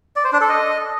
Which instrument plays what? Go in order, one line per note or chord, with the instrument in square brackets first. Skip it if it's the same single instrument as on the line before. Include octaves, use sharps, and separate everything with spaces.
[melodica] D5
C5
D4
A4
D#5